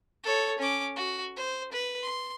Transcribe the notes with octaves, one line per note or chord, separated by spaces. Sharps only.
A4 C#5
C#4 D6
F#4
C5
B4
C6